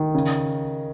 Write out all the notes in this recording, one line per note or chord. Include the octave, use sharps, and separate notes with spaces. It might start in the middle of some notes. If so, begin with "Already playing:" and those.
Already playing: D#3
C#3